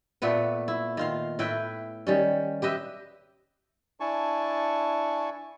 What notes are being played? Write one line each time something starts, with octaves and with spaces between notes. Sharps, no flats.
A#2 A3 B3 B4
E4
D#3 F4 F5
A2 E4 B4 G5
D#3 G3 C#4
G4 B4 D#5 E5
D4 E4 G#5 A5 C#6